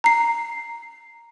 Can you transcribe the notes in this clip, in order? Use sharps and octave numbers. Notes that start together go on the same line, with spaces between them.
A#5 C7